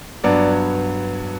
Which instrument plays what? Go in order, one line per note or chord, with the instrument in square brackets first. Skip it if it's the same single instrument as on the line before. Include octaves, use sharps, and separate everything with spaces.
[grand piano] G2 F#3 B3 D5